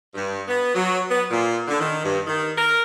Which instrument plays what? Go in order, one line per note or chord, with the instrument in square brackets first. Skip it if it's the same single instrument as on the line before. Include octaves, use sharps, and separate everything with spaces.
[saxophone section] G2
B3
F#3
B3
A#2
D3
D#3
G2
D#3
A#4